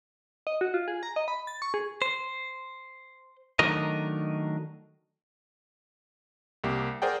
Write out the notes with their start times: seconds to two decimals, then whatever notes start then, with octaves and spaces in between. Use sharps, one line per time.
0.47 D#5
0.61 F#4
0.74 F4
0.88 G#4
1.03 A#5
1.16 D#5
1.28 B5
1.47 A6
1.62 C#6
1.74 G#4
2.02 C5
3.59 D#3 F#3 A3 D4 A#4 D#5
6.64 C2 A#3 G4
7.02 G#4 A#4 C5 D5 F#5 G5